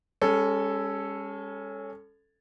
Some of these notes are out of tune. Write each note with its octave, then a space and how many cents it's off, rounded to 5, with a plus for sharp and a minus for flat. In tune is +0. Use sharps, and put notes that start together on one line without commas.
G#3 -45 C#4 +0 A4 +0